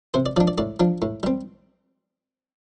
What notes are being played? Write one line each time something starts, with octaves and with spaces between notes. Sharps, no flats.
C3 C5
D5
F3 D4 D5
D5
A2 D5
F3 D4
A2
G3 C4